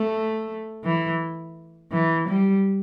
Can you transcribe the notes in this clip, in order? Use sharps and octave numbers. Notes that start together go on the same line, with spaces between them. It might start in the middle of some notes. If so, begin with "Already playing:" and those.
Already playing: A3
E3
E3
G3